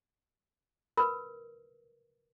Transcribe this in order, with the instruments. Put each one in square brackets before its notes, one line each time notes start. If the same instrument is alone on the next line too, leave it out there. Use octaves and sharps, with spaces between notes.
[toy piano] A#4 B4 [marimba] B5